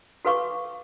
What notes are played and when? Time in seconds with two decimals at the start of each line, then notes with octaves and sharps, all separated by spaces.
0.25 F#4 A4 B4 F5 C#6 D6